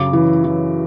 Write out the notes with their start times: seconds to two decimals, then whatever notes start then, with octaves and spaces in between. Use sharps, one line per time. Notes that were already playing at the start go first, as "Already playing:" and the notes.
Already playing: F#2 C#3 F#3 D6
0.13 E3
0.44 E3